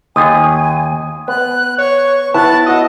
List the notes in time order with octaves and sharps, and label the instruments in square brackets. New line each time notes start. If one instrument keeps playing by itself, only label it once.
[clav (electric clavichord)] D#2 [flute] G#5 [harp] D#6
[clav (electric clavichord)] B3 [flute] F#6
[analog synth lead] C#5 [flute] C#6
[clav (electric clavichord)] B3 [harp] E4 [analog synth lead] A5 [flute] F#6
[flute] F#4 [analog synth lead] D#5